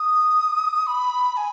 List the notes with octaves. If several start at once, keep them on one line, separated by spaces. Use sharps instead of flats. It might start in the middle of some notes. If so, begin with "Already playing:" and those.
Already playing: D#6
B5
G#5